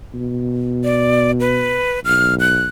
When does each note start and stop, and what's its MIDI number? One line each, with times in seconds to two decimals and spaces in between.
0.14 1.84 47
0.84 1.31 74
1.40 2.00 71
2.05 2.68 35
2.05 2.35 89
2.40 2.67 90